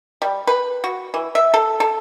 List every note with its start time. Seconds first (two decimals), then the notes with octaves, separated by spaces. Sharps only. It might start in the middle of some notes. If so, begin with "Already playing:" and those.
0.22 G3
0.47 B4
0.84 F#4
1.14 E3
1.35 E5
1.54 A4
1.80 A4